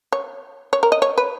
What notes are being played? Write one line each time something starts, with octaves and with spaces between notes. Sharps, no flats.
C#5
C#5
A#4
D#5
C#5
B4